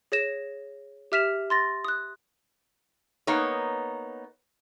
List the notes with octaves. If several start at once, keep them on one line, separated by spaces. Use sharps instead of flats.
G#4 C#5 A#6 E7
G4 E5 F6 B6 E7 F7
C6 A6 A#6
D#6 F#6
A#3 B3 D#4 C#5